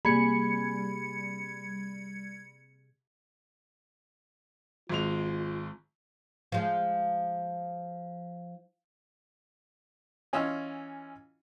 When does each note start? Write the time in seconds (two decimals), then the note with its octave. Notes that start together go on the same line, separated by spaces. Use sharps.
0.05 C3 G3 A#3 G#4 B5 G#6 C#7
4.89 G#1 G#3 F4 F7
6.52 F3 G#3
10.33 E3 C#4 F4 D#5 E6